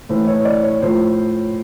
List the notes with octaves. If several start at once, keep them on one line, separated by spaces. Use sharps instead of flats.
A2 E3 C5
C#5
D5
C#5
A2 F3 C5